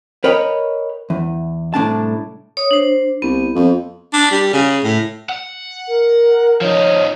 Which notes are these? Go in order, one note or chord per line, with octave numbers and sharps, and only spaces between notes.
A#4 B4 C#5 D#5 G5 B5
E2
C2 A2 D4 A5
C#5 D#6
D4 C5
C2 B3
F2
D4
G3
C#3
A2
F#5
A#4
F3 D#4 C#5